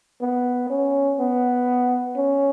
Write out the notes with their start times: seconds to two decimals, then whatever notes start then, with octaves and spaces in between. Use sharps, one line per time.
0.21 B3
0.70 C#4
1.19 B3
2.16 C#4